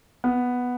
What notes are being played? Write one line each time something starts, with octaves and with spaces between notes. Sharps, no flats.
B3